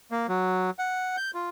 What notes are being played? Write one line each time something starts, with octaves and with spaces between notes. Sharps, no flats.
A#3
F#3
F#5
G6
F4